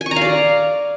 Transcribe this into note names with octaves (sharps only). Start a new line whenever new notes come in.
G#5
C#6
A#5
F5
D5